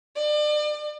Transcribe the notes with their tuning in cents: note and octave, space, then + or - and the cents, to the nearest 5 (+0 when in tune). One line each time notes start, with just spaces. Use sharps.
D5 +35